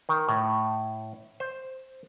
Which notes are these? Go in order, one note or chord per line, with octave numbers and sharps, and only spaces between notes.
D#3
A2
C5